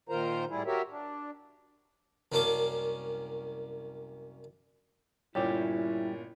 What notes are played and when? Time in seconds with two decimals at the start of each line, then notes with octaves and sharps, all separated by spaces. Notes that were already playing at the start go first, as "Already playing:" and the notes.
0.09 A#2 D#3 F4 A#4 C5 A#5
0.49 A2 G3 E4 G#4
0.66 F#4 G4 A#4 C#5 E5
0.90 D4
2.32 C2 F#2 A#3 C#4 A5 D6
5.35 G1 A#2 G3 C#4 E4 G4 C#5